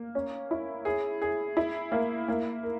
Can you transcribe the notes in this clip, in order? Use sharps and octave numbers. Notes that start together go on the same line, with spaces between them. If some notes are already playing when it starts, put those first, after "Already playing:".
Already playing: A#3
C#4
E4
G#4
G#4
E4
A#3
A#3
A#4